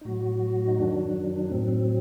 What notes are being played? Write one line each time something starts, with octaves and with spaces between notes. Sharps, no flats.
D#4
A2 F#3 F#4
D#4
F#2 D#3 F#3 D4
D4
A2 F#3 C4